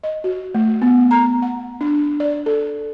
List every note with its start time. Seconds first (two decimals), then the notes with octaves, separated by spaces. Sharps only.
0.04 D#5
0.24 F#4
0.55 A3
0.82 B3
1.11 A#5
1.42 F#5
1.81 D4
2.20 D5
2.46 A4